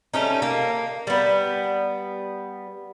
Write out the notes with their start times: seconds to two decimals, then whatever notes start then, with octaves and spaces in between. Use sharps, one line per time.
0.14 G3 A3 C#4 D#4
0.42 A#3
1.07 G3 B3